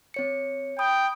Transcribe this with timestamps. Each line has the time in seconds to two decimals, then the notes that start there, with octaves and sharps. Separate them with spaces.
0.14 C4 C#5 C#7
0.79 G5 B5 D#6